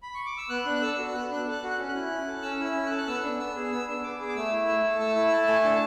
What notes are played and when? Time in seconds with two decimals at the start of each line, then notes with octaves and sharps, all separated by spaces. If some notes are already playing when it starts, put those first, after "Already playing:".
0.03 B5
0.14 C#6
0.26 D6
0.38 E6
0.49 B3 F#6
0.66 D4
0.75 F#6
0.82 A4 E6
0.98 F#4
1.14 B3 F#6
1.31 D4 F#6
1.47 A4 F#6
1.63 F#4
1.71 F#6
1.79 C#4
1.89 F#6
1.95 E4
2.10 C#4
2.27 A4
2.42 C#4 E6
2.59 E4
2.65 E6
2.75 C#4
2.86 F#6
2.91 A4
2.97 F#6
3.08 B3 E6
3.23 D4
3.39 B3 E6
3.56 G#4
3.71 B3 E6
3.88 D4
4.03 B3 D6
4.20 G#4
4.28 D6
4.36 A3 E6
4.52 E4
4.67 A3 E6
4.83 A4
5.00 A3 E6
5.15 E4 E6
5.32 A3 A5
5.48 A4 G#5
5.64 D4 A5